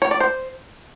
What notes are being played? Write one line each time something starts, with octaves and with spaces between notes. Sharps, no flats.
C#5
D5
C5